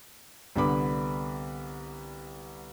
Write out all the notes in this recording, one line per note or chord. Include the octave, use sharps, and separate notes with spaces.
C2 D3 B3 B5 D6